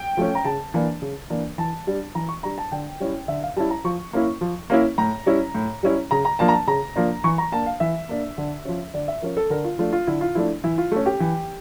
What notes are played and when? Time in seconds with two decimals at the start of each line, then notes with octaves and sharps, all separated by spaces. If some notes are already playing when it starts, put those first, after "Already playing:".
Already playing: G5
0.17 F3 A3 C#4
0.35 A#5
0.45 C#3 A5
0.74 E3 A#3 D4
1.02 C#3
1.30 E3 A#3 D4
1.58 E3 A5
1.87 G3 D4
2.15 E3 A#5
2.29 C#6
2.43 G3 D4 A#5
2.58 A5
2.72 D3 G5
3.00 G3 C#4 E4
3.28 D3 E5
3.43 F5
3.56 G3 C#4 E4 A5
3.70 A#5
3.84 F3 C#6
4.13 A#3 C#4 E4
4.41 F3
4.70 A#3 C#4 E4
4.98 A2 A#5
5.26 G3 C#4 E4
5.55 A2
5.83 G3 C#4 E4
6.11 C#3 A#5
6.25 A#5
6.39 F3 A#3 D4 A5
6.48 A#5
6.53 A5
6.67 C#3 A#5
6.96 F3 A#3 D4
7.24 E3 C#6
7.38 A#5
7.52 A#3 D4 A5
7.66 F5
7.80 E3 E5
8.09 A#3 D4
8.38 D3
8.65 F3 C#4
8.94 D3 D5
9.08 E5
9.22 F3 C#4 A#4
9.37 A4
9.50 D3 A#4
9.64 F4
9.79 F3 A3 D4 F4
9.92 F4
10.07 D3 E4
10.21 F4
10.35 F3 A3 D4 E4
10.64 E3 E4
10.78 F4
10.92 A3 C#4 A4
11.06 G4
11.20 E3